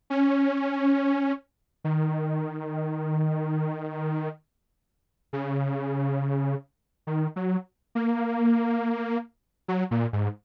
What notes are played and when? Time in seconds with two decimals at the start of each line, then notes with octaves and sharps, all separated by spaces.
0.10 C#4
1.84 D#3
5.33 C#3
7.07 D#3
7.36 F#3
7.95 A#3
9.68 F#3
9.91 A#2
10.13 G#2